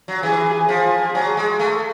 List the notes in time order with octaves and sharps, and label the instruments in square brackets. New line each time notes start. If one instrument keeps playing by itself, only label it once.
[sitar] F#3
[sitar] E3 [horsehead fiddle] G#4
[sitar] F3 [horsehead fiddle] G#4
[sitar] F#3
G#3
A3